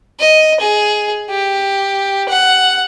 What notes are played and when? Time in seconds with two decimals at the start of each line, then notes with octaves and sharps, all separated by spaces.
0.20 D#5
0.60 G#4
1.30 G4
2.29 F#5